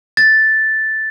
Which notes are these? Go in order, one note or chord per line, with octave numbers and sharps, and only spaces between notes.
A6